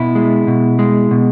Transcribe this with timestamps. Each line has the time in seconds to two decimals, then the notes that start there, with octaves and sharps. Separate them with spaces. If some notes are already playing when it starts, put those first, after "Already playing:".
Already playing: B2 E4
0.15 G#3
0.47 B2
0.79 G#3
1.11 B2